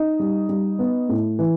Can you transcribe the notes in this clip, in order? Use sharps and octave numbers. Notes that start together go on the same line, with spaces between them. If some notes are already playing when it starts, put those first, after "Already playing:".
Already playing: D#4 D#5
G3
G3
B3
A2
E3